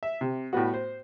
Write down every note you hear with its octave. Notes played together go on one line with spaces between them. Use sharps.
E5
C3
A2 G3 B3 F#4
C5